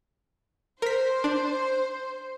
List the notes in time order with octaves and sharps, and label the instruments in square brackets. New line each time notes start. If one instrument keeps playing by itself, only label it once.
[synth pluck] A#4 B6 [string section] C5
[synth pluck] D4